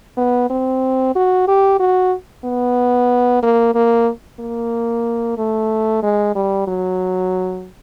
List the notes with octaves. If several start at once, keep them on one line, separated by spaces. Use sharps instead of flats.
B3
C4
F#4
G4
F#4
B3
A#3
A#3
A#3
A3
G#3
G3
F#3